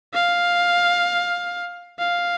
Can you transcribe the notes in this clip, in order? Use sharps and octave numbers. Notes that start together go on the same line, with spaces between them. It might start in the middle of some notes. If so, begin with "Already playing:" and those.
F5
F5